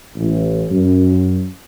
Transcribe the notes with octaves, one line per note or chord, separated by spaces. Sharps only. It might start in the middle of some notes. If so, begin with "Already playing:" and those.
A1
F#2